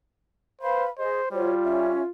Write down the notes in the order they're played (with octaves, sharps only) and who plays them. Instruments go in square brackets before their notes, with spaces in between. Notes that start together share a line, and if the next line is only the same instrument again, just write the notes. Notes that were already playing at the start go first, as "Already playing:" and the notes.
[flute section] B4 F5 B5 [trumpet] C5
[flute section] G#4 D#5 [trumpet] C5
[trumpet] G3 [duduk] F4 [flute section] F#4 C5 C#5
[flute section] C#4 C#5 E5